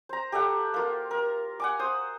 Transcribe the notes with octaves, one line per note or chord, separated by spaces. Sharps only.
C5 A#5
G4 A4 E5 F#5
A#3 F4
A#4
F#5 G#5 D6
C5 D#6